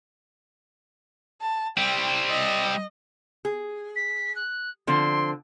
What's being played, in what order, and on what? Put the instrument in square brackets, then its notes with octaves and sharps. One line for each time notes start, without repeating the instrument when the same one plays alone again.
[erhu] A5
[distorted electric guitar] G3 C4 [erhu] G5
[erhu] D#5
[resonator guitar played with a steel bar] G#4
[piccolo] B6
F#6
[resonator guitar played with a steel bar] D3 F3 C4 [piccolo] C6